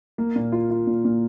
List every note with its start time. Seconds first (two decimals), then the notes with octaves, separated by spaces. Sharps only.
0.18 A#3
0.36 A#2
0.52 F4
0.70 F4
0.87 A#2
1.05 A#2